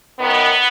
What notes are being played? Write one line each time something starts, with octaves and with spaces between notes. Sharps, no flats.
F#2 D#3 B3